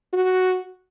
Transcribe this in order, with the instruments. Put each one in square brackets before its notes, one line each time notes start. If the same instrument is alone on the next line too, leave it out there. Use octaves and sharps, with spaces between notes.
[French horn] F#4